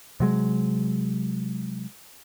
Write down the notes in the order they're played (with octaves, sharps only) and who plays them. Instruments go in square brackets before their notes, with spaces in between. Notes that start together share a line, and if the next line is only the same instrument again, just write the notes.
[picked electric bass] C3 F#3 G#3